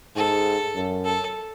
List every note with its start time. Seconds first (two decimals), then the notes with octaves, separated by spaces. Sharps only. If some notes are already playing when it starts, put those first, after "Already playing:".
0.16 G#2 A4
0.75 F#2
1.05 A4